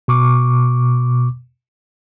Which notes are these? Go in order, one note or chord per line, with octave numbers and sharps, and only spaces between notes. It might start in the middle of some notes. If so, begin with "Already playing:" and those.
B2 C#6 D6